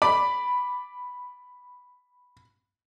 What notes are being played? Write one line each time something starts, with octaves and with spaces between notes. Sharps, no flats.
D5 B5